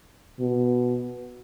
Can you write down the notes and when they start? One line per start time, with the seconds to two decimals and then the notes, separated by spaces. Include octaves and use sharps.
0.40 B2